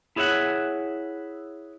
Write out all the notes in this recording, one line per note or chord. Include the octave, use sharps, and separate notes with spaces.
E4 G#4 C#5 E5 F#5